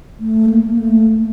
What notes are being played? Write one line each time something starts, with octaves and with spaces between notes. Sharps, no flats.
A3
A#3
A3